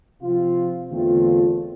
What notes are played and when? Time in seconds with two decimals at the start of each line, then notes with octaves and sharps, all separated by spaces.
0.21 C3 F3 C4 F4
0.90 E2 D3 A3 C4 F4